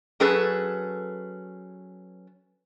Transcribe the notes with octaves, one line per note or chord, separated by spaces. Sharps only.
F#3 C#4 G#4 A4 B4